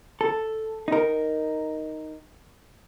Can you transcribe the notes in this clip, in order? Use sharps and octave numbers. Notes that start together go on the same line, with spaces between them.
A4
D#4 A#4